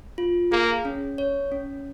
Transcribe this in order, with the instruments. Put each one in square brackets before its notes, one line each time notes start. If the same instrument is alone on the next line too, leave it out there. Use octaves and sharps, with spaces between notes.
[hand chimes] F4
[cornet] A#3 [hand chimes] G#4
[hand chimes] C#4
C#5
C#4